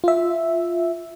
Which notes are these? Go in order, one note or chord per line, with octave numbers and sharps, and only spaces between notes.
F4 E5